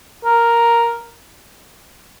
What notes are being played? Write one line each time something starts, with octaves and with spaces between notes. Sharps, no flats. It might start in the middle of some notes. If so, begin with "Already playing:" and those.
A#4